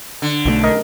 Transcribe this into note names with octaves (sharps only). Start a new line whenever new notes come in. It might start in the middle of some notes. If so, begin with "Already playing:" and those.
D3
B1 D#3 A3
A#4 D#5